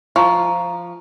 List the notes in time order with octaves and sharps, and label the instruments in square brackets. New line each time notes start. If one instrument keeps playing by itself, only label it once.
[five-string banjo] F3 [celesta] A#5 C#6